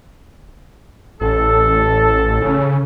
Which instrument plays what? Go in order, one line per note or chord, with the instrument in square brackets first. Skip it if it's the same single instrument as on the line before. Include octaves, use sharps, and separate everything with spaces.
[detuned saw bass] A1 [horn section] A4
[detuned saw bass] C#3